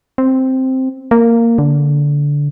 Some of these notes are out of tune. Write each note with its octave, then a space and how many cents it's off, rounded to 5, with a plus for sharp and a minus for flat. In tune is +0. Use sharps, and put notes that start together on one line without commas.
C4 +0
A#3 -10
D3 -15